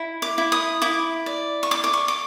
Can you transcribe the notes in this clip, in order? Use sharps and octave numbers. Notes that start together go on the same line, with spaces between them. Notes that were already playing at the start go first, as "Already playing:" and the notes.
Already playing: E4
D6
E4
D#6
E4 D6
D5
C#6
D5 D6
D6
C#6
D6